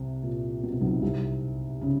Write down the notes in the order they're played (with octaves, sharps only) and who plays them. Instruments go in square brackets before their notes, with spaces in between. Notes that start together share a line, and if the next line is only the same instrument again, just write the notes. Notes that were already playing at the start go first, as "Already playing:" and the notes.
Already playing: [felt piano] C2 C3
A#2
B2
C3
B1 B2
C2 C3
C#3